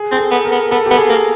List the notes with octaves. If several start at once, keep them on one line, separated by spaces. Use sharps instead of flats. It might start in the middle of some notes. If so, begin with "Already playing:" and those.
Already playing: G#4
C4 G#4
A4
B3
A#4
B3
B3 A4
B3 G4
G#4
A#3